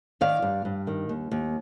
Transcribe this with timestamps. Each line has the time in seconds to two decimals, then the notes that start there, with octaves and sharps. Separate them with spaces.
0.21 D#3 D5 F5
0.42 G2
0.65 G2
0.87 D#3
1.09 D#2
1.31 D#2